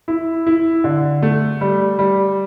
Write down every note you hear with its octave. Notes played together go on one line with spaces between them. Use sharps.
E4
E4
D3
A3
G3
G3